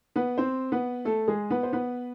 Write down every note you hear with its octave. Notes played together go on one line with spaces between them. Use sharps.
B3 B4
C4 C5
B3 B4
A3 A4
G#3 G#4
B3 B4
C5
B3 B4